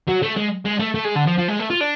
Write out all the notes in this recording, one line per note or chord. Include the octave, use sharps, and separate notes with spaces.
F#3
A3
G#3
G#3
A3
A3
G#3
D3
F3
F3
G#3
A3
F4
D4